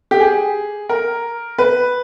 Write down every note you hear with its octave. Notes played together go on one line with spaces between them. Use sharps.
G4
G#4
A#4
B4